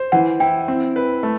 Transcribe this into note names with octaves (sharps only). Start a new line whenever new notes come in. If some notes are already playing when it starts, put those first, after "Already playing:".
Already playing: C5
E3 F#5
E4 G5
C4
B4
A3